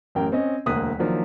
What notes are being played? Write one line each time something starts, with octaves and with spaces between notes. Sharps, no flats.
A1 F#2 A#4 G5
C4 C#4 D#5
E1 D2 A#3 D#6 F#6 B6
D#3 F3 F#3 A#3 D4